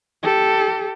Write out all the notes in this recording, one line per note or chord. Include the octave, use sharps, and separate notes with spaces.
G4 A4